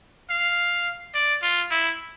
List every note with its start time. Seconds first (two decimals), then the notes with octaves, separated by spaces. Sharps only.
0.30 F5
1.14 D5
1.43 F4
1.71 E4